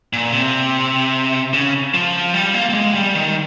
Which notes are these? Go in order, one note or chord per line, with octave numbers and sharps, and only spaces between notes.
A#2
C3
C#3
F3
G3
A#3
A#3
G#3
G3
D#3